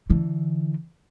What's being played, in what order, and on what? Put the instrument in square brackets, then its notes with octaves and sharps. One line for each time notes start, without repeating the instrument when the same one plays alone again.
[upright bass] D3 E3